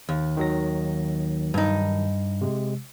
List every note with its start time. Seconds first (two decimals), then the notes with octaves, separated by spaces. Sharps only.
0.09 D#2
0.37 D#3 F#3 A#6
1.54 G2 D#4
2.41 C3 G#3